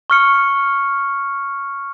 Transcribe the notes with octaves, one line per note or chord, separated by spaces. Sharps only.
C#6 F6 C#7